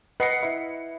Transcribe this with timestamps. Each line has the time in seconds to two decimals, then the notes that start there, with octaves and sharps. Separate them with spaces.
0.20 B4 D#5 F#5 C7 C#7
0.43 E4